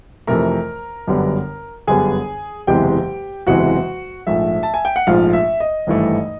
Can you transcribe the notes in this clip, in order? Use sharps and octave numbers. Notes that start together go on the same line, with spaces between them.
F2 C3 E3 A3 A#4 A#5
G1 F#2 D3 G3 B3
G1 F#2 D3 G3 B3 G#4 G#5
F#1 E2 C3 E3 G#3 G4 G5
F#1 E2 C3 E3 G#3 F#4 F#5
A#1 G#2 F3 A3 E5
A5
G#5
G5
F#5
A#1 G#2 F3 A3 F4 F5
E5
D#5
G#1 G2 E3 A3